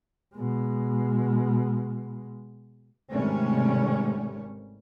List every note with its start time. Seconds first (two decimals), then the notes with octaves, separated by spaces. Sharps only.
0.35 B2 G#3
3.11 G#1 C3 G3 A3 C#4